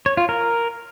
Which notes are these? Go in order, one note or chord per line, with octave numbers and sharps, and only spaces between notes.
C#5
F4
A#4